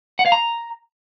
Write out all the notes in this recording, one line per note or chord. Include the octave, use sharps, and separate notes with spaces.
F#5
F5
A#5